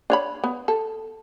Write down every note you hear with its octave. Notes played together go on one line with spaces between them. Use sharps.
D4 C#5 B5
B3
A4